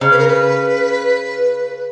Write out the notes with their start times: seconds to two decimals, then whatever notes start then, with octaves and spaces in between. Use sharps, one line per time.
0.01 C#3 C#4 C5
0.11 B4
0.18 A#4
0.28 B4